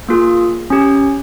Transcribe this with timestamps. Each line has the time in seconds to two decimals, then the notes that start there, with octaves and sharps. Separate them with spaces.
0.09 A#3 F4 G#4
0.70 C#4 G4